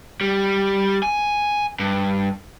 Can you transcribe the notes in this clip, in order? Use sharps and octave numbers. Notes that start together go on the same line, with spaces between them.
G3
G#5
G2